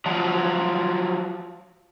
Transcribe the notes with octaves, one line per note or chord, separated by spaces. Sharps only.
F3 F#3